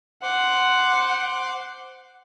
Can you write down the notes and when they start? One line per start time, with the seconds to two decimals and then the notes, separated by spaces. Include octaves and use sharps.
0.23 C5 F#5 C6 D6